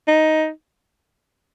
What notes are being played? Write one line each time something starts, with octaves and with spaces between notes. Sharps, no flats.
D#4